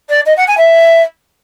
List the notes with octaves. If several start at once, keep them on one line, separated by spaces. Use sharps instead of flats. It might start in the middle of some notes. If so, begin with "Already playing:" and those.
D5
D#5
F#5
G#5
E5